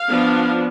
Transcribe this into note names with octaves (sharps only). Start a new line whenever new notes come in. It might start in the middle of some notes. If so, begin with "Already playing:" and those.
Already playing: F5
F3 B3 D4